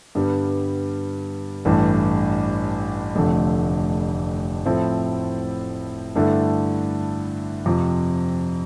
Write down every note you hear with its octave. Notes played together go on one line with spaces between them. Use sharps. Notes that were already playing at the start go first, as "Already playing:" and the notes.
G2 D3 G3 B3
A1 G2 E3 A3
F1 F2 D3 A3
A2 F3 C4 E4 A4
G2 D3 A3 E4 A4
F2 C3 F3